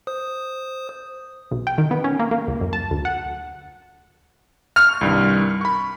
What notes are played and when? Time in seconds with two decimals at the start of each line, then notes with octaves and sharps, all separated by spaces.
0.07 C5 D#6
1.51 B1
1.67 G5
1.78 D#3
1.91 B3
2.04 C#4
2.19 A#3
2.31 A#3
2.48 C#2
2.61 F#2
2.73 A5
2.91 D2
3.05 F#5
4.76 C#6 F6
5.01 C2 G2 D#3
5.61 B5 C#6